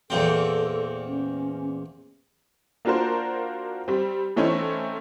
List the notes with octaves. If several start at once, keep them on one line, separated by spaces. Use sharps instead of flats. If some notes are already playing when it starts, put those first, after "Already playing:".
E2 A#2 C4 A4
C#4
A#3 D4 F4 F#4 A#4 C5
G3 C4
E3 A3 C4 C#4 D#4 E4